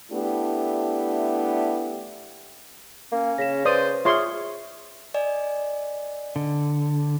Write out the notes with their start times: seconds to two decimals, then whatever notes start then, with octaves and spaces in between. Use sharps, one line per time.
0.11 A3 B3 D4 E4 G4
3.12 A#3 C#4
3.38 C#3 A#6 B6 E7
3.65 B4 C5 D5 C6 D#6
4.05 F4 G#4 C#5 E5 C6 F6
5.14 D5 D#5 G#5
6.36 D3